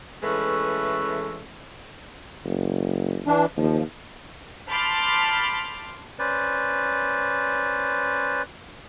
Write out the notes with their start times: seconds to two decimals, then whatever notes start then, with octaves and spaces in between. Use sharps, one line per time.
0.23 E3 G#3 A3 C#4 A4 B4
2.44 F#1
3.27 E3 D4
3.57 D#2 F3
4.69 A5 B5 C6 D6 F6 G6
6.19 C#4 B4 C5 D5